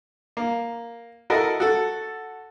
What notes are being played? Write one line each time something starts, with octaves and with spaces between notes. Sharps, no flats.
A#3
E4 F#4 A4 A#4 D#5
F#4 A4